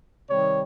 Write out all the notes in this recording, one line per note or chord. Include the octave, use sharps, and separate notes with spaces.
C3 D#3 G3 C#5